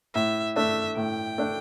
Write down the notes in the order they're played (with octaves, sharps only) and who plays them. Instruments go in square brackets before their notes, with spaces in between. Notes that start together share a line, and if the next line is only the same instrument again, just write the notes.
[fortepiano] A2 [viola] E5
[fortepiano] A3 D4 [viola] E5
[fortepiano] A2 [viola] G5
[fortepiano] A3 D4